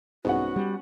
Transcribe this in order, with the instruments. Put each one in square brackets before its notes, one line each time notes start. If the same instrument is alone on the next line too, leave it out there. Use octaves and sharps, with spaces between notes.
[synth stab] C2 G#2 [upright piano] B3 C#4 F#5 [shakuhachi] F#4
[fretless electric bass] G3